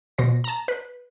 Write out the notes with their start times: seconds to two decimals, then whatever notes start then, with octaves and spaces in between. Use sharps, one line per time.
0.18 B2 C5 A#6
0.44 A5 A#5
0.68 B4